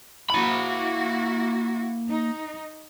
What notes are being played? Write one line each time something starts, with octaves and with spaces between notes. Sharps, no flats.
A#3 E4 F#4 B5
D#4